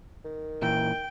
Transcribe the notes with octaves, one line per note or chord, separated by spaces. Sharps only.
D#3
A#2 E3 G5